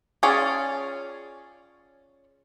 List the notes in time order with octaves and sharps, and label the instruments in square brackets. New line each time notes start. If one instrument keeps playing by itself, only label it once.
[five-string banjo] C#4 F4 G#4 C#5 D5